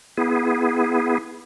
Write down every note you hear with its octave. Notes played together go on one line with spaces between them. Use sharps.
B3 E4 G#4